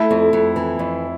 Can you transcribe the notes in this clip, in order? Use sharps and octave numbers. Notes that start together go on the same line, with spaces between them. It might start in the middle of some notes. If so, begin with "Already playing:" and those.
Already playing: A3 E4
F2
F2
E3
F2